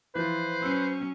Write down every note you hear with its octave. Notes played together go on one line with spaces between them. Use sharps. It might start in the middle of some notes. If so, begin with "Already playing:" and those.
E3 F3 B4 C5
F#3 C#4 E6 C7